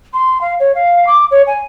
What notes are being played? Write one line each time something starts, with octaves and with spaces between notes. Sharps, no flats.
C6
F5
C#5
F5
D6
C#5
G#5